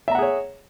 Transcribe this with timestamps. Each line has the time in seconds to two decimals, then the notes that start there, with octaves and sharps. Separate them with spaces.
0.08 E5
0.11 A#5
0.15 F#5
0.19 G#4
0.22 C#5